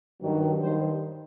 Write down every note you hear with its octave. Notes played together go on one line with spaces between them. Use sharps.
G2 D#3 F#3
G2 D#3 G3 C5